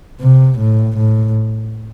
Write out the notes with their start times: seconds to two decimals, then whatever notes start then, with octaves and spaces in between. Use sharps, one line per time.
0.20 C3
0.58 A2
0.97 A2